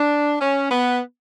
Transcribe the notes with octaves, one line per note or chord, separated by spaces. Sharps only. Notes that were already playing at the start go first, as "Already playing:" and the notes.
Already playing: D4
C#4
B3